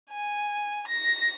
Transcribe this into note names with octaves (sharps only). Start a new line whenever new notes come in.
G#5
A#6